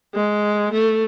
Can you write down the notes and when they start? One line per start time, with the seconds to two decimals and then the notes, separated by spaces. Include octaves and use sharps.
0.15 G#3
0.72 A3